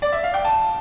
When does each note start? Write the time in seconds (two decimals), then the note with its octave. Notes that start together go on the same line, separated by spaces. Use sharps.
0.02 D5
0.12 E5
0.23 F5
0.34 G5
0.45 A5